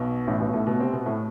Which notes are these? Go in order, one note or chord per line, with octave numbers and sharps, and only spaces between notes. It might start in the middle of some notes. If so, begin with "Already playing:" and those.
Already playing: B1 B2
A1 A2
B1 B2
A2 A3
B2 B3
C3 C4
B2 B3
A2 A3